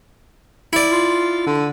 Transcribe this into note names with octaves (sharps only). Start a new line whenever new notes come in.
E4 D5
F4
D3